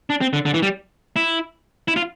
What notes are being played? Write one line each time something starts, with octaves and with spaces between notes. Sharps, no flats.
D4
C4
D3
D3
E3
G3
E4
E4
F4